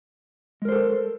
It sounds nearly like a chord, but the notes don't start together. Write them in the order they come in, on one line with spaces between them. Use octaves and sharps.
G#3 A#4 C5 A4